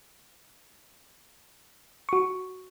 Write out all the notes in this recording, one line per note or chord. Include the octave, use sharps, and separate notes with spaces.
F#4 C#6